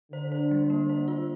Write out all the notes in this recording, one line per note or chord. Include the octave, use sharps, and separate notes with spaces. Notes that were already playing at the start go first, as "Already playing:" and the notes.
D3 C5
C5
G3
A#3
C5
F4